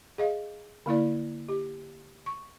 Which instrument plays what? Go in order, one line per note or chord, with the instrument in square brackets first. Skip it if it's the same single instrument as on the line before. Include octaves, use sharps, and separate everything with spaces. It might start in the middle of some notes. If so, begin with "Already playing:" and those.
[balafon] G#4 D#5 F5
D3 A#3 E4 D5
G4
C#6